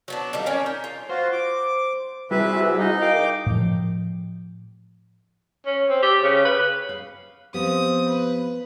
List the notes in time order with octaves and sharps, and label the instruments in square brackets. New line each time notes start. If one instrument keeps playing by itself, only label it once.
[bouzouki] F#3 B3 D4
D3 G3 A#3 D#4
C#4 D4 A#4 C#5
D#4
F4
[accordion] F4 F#4 [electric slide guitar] C5
[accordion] D6
[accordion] C3 [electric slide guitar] G3 [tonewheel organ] E4 F#4 G#4 [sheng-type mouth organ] B4 E5
[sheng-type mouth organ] D#4 D#5
[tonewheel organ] A#4 [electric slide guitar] F5 [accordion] G5 D6
[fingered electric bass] A2 F3
[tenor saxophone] C#4
C4
G4
C#3
B4
[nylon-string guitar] F5
[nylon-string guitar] F3 B3 G4 [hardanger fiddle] C4 D#6
[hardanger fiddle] B4